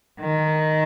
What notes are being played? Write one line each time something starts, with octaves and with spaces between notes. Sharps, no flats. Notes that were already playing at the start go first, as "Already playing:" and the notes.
D#3